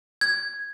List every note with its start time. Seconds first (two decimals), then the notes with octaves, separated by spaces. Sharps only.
0.21 G#6